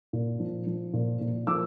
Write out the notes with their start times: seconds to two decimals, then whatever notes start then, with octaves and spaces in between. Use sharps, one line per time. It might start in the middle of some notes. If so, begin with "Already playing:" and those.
0.13 A#2
0.40 F3
0.67 F3
0.93 A#2
1.21 A#2
1.47 F3 D6 E6